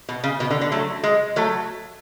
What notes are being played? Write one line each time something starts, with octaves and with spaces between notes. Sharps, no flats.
B2
C#3
B2
D3
D3
F#3 A3
G#3
F#3 A3